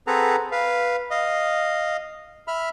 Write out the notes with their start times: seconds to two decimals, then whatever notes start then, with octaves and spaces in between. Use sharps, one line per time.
0.07 C4 G#4 A4 B4 F#5 A#5
0.52 B4 F5
1.11 D#5 F5
2.48 E5 B5 F6